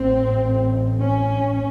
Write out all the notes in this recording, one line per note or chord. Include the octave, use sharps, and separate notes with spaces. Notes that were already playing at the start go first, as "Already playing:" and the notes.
Already playing: A1 A2 C4
C#4